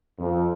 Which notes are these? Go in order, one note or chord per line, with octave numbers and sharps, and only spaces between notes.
F2